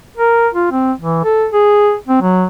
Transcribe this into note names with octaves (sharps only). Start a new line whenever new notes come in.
A#4
F4
C4
E3
A4
G#4
C4
F#3